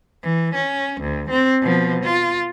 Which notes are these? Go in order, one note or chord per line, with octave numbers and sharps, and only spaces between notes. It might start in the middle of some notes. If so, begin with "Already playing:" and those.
E3
C#4
D2
C4
B2 F3
F4